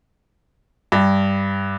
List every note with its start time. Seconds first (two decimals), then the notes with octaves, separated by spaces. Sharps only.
0.92 G2